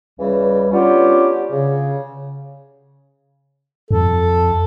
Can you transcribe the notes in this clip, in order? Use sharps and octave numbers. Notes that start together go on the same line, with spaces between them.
C#2 C#3 E3 G3
B3 C#4 D4 F4 G4
C#3
F2 A4